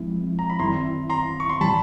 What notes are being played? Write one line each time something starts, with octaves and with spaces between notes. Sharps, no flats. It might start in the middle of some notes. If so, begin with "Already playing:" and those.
Already playing: F3 G#3 C4 E4
A#5
B5
F#2 D#3 G3 C4 E4 A#5 C6
A#5 C6
C#6
C6
A2 E3 G3 A5 B5